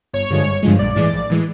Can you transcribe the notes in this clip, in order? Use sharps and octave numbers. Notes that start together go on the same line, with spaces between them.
G1 C#5
G2 D3 F3 G#3
G1
G2 D3 F3 G#3
A#1 D5
A2 E3 G#3
A#1
A2 E3 G#3